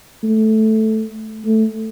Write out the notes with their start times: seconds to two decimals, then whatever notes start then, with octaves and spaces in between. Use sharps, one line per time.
0.23 A3
1.45 A3